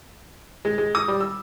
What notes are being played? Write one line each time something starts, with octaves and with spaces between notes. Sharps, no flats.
G#3
G#3
D#6
G3
E6